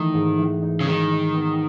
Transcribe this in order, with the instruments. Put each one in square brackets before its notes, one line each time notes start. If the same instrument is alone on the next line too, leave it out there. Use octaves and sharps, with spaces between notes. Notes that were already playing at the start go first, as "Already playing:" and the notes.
Already playing: [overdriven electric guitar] D#3 [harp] E3 A3 D#4
[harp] G#2
E3
D#4
[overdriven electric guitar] C#3
[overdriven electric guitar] D#3 [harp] G#3
[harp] D#4
B3